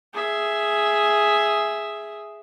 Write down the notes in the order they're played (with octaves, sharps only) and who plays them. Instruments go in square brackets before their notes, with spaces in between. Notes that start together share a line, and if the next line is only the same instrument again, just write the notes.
[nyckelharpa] G#4 E5